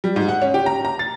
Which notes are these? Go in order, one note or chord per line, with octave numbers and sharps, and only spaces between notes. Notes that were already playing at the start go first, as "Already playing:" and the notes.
G3
G#2
F#5
C#4
G4
A#5
A#5
A6